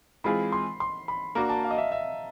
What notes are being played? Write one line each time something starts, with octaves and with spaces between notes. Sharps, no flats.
E3 G#3 C4 F4 G#4 B5
C6
C6
B5
A#3 D4 F#4 A#5
A5
F5
D#5
E5
E5